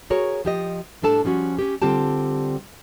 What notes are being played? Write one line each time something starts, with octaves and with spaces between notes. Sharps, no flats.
F#4 G#4 A#4 C#5
F3 G4 D#5
A2 G3 D4 A4 A5
F3 G3 C#4 F#4
C#4 G4
D3 G3 C4 F4 G4 A5